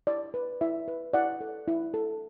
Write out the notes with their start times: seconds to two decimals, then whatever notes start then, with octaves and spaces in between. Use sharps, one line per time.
0.07 E4 D5
0.34 B4
0.61 E4 E5
0.88 B4
1.13 E4 D5 F#5
1.41 A4
1.68 E4
1.94 A4